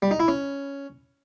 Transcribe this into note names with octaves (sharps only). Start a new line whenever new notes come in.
G3
D#4
E4
C#4